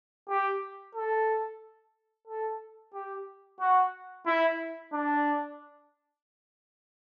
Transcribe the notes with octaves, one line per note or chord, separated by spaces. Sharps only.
G4
A4
A4
G4
F#4
E4
D4